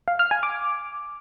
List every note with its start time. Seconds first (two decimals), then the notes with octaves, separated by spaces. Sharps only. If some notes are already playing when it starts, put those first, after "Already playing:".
0.08 F5
0.19 F6
0.31 G#5
0.43 D6